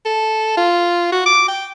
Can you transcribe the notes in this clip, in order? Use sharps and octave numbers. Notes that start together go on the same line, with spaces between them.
A4
F4
F#4
D6
G5